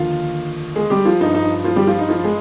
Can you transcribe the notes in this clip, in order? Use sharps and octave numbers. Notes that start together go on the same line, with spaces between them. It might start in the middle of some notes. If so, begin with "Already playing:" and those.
Already playing: D#2 D3 F3 F4 F5
G#3 G#4
G3 G4
F3 F4
G2 F3 D#4
D#4
F3 F4
G3 G4
F3 F4
D#4
F3 F4
G#3 G#4